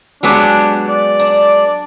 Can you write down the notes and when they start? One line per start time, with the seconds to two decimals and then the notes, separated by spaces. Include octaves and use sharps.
0.23 F#3 G#3 B3 D4 G4
0.88 D5
1.20 D4